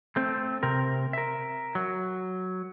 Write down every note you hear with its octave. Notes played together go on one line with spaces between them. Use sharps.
A3 C4
C3 C4 A#4
A#4 E5
F#3